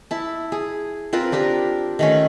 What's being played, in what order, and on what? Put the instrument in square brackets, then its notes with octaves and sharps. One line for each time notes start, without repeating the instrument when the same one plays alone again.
[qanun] E4 A5
G#4
C4 F4 A#4 B4
D4 G4 A#4
D#3 A3 C#4